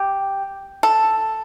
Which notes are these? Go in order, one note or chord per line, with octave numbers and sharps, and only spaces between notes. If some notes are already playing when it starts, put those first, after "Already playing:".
Already playing: G4
A4